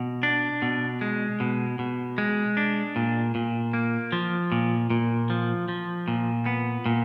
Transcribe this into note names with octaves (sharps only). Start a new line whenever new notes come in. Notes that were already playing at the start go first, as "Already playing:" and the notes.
Already playing: B2
D4
B2
G#3
B2
B2
G#3
D4
A#2
A#2
A#3
F3
A#2
A#2
F3
F3
A#2
B3
A#2